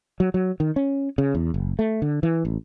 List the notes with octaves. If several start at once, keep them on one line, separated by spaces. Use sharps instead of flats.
F#3
F#3
D#3
C#4
C#3
E2
F#1
A3
D3
E3
A1